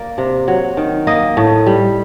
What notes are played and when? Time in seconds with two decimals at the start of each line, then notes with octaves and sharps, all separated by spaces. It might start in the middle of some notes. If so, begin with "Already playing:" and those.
Already playing: A#3 D5
0.18 C3
0.48 F#3
0.77 D#3
1.07 A#3 D#5
1.37 A2
1.66 G3